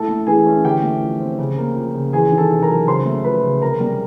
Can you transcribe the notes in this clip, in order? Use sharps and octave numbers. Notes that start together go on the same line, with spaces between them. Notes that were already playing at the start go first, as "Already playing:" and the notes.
Already playing: A2 A4 A5
A3
E3 G#4 G#5
C#4
D3 G4 G5
A3
F3
C4
C#3
A#3
F3
C#3
E2 G#4 G#5
D#3
A4 A5
C3
A#4 A#5
F#3
C#3 C5 C6
A3
F3 B4 B5
C#3
C3 A#4 A#5
G3